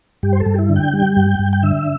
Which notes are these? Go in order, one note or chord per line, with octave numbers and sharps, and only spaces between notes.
G2 G4
C5
A4
G2
G4
E4
D3
G5
G3
G2
G2
G5
D3 E5